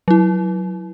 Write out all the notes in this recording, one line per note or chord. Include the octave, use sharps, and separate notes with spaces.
F#3 E4